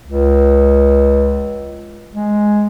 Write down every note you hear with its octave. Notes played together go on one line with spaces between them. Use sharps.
C#2
G#3